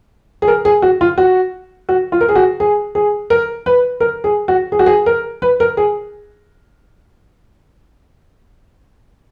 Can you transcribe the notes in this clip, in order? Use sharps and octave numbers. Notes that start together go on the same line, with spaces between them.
G#4
A#4
G#4
F#4
F4
F#4
F#4
F4
A#4
G#4
F#4
G#4
G#4
A#4
B4
A#4
G#4
F#4
G#4
F#4
G#4
A#4
B4
A#4
G#4